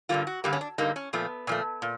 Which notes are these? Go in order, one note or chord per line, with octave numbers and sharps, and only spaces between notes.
G2 D3 G3 A#3 F4
F#4
G2 D3 G3 A#3 G4
C#4
D4
G2 D3 G3 A#3 D#4
C#4
A#2 F3 A3 B3
A#2 F3 A3
A#2